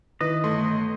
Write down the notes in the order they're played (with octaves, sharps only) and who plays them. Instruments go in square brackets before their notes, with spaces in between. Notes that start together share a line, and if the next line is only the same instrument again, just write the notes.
[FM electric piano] D#3 E4 [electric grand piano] B4 [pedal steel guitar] D#5
[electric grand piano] G1 A3 C6